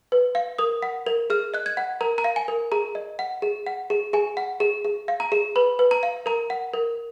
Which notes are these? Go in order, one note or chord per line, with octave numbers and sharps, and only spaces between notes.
B4
F5
A#4 D#6
F#5
A#4
G#4 F6
D#5 F#6
G#6
F#5
A#4 A#5
A#5
F5
G#5
A#4
G#4 A#5
D#5
F#5
G#4
F#5
G#4
G#4 G#5
F#5
G#4
G#4
F5
A#5
G#4
B4 B5
B4
A#5
F5
A#4 A#5
F#5
A#4